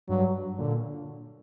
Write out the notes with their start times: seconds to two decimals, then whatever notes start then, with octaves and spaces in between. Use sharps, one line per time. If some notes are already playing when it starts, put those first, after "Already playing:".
0.09 G2 F#3
0.58 A#2 D3